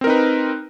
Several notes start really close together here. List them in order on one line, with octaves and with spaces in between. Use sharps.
C4 A#4 D#4 B4